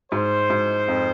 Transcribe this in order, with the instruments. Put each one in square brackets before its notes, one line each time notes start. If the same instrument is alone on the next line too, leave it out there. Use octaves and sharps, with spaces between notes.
[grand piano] G#2 [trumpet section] C5
[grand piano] G#2
F2